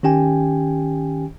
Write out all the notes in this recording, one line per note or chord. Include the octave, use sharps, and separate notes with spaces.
D#3 C#4 G4 G5 G#5